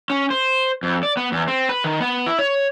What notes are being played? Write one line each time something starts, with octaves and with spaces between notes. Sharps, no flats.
C#4
C5
F2
D5
B3
E2
C4
B4
D#3
B3
E4
C#5